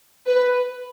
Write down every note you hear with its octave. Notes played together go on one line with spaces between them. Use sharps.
B4